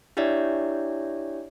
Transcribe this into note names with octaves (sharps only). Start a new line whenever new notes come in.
D4 E4 G4 C#5 D5 E5